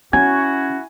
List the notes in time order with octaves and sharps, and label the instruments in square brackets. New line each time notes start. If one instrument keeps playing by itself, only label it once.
[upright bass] C#4 [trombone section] E4 F#4 [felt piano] G#5 [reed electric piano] G#6